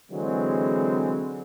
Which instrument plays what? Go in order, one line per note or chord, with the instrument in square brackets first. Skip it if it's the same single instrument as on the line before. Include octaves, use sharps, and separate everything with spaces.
[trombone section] D3 E3 F#3 G#3 C4